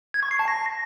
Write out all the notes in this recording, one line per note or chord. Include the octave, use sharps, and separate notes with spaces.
G#6
C#6
C7
A5
A#6